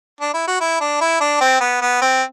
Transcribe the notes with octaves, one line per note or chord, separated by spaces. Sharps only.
D4
E4
F#4
E4
D4
E4
D4
C4
B3
B3
C4